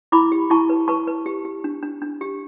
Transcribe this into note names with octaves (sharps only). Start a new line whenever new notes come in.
E4 B5 D6
G4
E4 A5 C#6
B4
B4 A5 C#6
B4
G4
G4
D4
D4
D4
G4